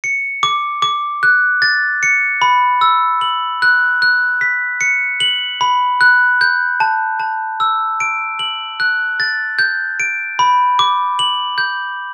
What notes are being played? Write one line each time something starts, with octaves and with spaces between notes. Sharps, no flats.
C#7
D6
D6
F#6
A6
C#7
B5
E6
F#7
F#6
F#6
B6
C#7
F#7
B5
F#6
G6
A5
A5
E6
D7
F#7
F#6
A6
G6
D7
B5
D6
F#7
G6